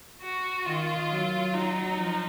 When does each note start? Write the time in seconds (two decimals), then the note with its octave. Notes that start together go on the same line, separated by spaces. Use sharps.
0.22 F#4
0.66 D#3 F4
1.10 F#3
1.54 F#3 D#4
1.98 F3